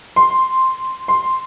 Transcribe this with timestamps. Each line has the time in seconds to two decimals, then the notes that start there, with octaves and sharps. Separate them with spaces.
0.16 C6
1.08 C6